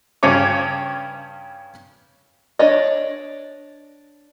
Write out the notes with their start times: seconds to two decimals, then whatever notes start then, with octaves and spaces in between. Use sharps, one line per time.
0.23 G2 C#3 C#4 C#5 D6
2.59 D4 C#5 D#5